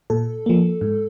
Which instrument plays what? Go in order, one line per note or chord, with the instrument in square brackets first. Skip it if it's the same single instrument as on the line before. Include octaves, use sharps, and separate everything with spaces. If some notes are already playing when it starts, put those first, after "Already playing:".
[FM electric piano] A#2 A4
F3 A#3
G#2